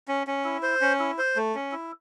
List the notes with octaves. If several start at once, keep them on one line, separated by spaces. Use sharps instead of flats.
C#4
C#4
E4
C5
C#4
E4
C5
A3
C#4
E4